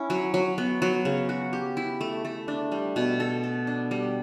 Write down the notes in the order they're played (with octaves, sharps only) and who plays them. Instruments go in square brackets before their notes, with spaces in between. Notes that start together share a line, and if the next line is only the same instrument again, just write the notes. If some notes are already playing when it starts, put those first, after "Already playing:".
Already playing: [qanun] C#4 E4
F#3
F#3
B3
F#3
C#3
F#4
G4
E4
A3
A3
D4
G3
B2
A4
A4
D4
G3